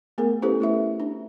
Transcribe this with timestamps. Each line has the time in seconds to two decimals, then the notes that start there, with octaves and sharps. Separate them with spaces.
0.18 A3 B3 G#4 A#4
0.42 C#4 E4 G4 A4 B4 C5
0.60 A3 E4 E5
1.00 D4